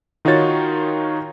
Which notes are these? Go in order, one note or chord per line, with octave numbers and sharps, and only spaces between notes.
D#3 D#4 F4 F#4 C#5 A6